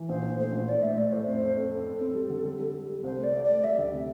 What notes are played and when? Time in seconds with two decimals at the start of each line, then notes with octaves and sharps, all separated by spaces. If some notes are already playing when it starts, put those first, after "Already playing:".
Already playing: E3
0.08 A#1 C5
0.23 A#1
0.37 A3 C5
0.52 A#1
0.67 A2 D5
0.82 A2 E5
0.97 A2 D5
1.12 A2 C5
1.26 F2 C5
1.41 F2
1.57 F2 A4
1.71 F2
1.86 C4
2.01 C4
2.15 G3
2.30 D3
2.45 G3
2.60 G3
2.74 G3
2.89 G3
3.03 C2 C5
3.18 A3 D5
3.34 A3
3.44 A3 D5
3.63 G3 E5
3.78 D2
3.93 C3